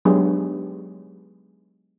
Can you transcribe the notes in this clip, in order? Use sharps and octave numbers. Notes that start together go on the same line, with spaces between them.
F#3 G#3 B3 D4 G4 G#4